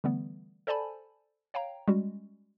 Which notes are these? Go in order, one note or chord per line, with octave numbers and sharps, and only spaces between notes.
D3 E3 G3 A3 B3
A4 C5 D5 G#5 A5 B5
C#5 F5 G5 A#5
G3 G#3 C#4 F#4